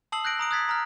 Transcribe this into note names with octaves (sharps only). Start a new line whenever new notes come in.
A5 D#6 E6 C7 F#7
F#6 G6 A#6 D7 F#7
A#5 D#6 D7
D#6 F#6 G#6 A6 B6
A#5 F6